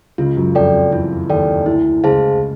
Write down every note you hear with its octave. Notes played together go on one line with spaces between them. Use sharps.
C#2 C#3 F4
F#2 F#3
F2 F3 A4 D5 G5
F2 F3
E2 E3 F4
D#2 D#3 A4 D5 G5
D2 D3 E4
C#2 C#3 G#4 C5 F5 A5